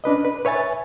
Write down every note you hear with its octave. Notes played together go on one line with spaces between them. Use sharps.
C#4 D4 B4 D#5
B4
B4 C#5 E5 G#5 A6